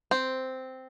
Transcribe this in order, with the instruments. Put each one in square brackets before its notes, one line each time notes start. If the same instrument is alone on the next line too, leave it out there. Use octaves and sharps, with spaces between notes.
[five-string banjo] C4